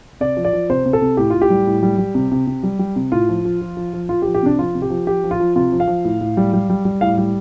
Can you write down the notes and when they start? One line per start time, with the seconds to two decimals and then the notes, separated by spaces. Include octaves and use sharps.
0.21 C3 D5
0.37 F3
0.45 D5
0.53 F3
0.70 C3 C5
0.86 C3
0.93 A4
1.02 C3
1.17 A2 G4
1.30 A2 F4
1.42 G4
1.50 G3
1.67 A2
1.83 G3
1.98 G3
2.15 C3
2.32 C3
2.47 C3
2.63 G3
2.79 G3
2.96 C3
3.12 A2 F4
3.29 F3
3.45 F3
3.61 F3
3.77 F3
3.93 F3
4.09 F3 F4
4.22 G4
4.26 F3
4.35 G4
4.43 C3 D4
4.59 F3 F4
4.75 C3
4.82 G4
4.90 F3
5.07 F3 G4
5.24 F3
5.31 F4
5.40 F3
5.56 C3 F4
5.72 F3
5.80 F5
5.87 F3
6.05 A2
6.21 A2
6.37 G3
6.53 G3
6.70 G3
6.85 G3
7.01 A2 F5
7.18 G3